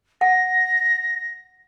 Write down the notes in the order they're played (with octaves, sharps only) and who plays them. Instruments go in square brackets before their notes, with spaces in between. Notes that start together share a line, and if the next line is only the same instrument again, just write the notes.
[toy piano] F#5 [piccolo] A#6